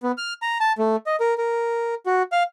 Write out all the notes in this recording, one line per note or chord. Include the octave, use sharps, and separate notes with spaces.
B3
F6
A#5
A5
A3
D#5
A#4
A#4
F#4
F5